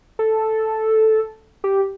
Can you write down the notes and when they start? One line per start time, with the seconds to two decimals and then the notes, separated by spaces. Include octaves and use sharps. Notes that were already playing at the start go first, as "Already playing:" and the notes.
0.19 A4
1.64 G4